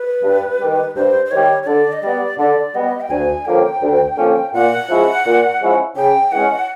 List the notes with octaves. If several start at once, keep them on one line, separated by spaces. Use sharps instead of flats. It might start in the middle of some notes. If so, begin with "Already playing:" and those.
Already playing: B4
G2
D#3 G3
G2 C5
C5
D#3 G3 C#5
C#5
D3 D5
D#5
G3 B3 D5
D3 D5
G3 B3 D#5
G5
D2 G#5
D3 F3 A#3 C#4 G5
D2
D3 F3 A#3 C#4
A#2 F#5
F3 G#3 C#4 E4
A#2
F3 G#3 C#4 E4
C#3 G5
E3 G#3 C#4 F#5